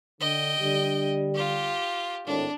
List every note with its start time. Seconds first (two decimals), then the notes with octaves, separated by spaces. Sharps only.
0.20 D3 D#5 G5
0.59 D3 G3
1.34 F4 G4
2.27 G#1 A2 D4